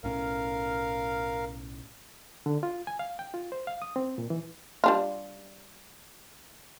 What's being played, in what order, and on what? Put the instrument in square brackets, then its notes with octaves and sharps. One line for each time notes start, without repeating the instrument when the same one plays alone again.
[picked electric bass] B1 A2 C#4 [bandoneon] A#4 F5
[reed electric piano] D3
F4
G#5
F5
G5
F4
C5
F5
D#6
C4
A#2
E3
[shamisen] G3 D4 F4